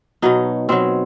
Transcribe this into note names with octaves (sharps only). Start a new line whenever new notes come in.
B2 F#3 D#4
B2 F#3 C4